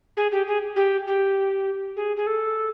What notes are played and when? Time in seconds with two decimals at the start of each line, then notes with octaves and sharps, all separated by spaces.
0.17 G#4
0.32 G4
0.47 G#4
0.76 G4
1.07 G4
1.97 G#4
2.17 G#4
2.27 A4